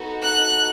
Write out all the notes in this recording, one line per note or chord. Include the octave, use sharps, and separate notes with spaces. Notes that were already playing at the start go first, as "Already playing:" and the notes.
Already playing: B3 D#4 F#4 A4
F#6